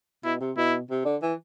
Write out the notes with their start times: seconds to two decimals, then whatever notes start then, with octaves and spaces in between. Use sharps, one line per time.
0.24 B2 E4
0.40 C3
0.57 B2 E4
0.90 C3
1.05 D3
1.22 E3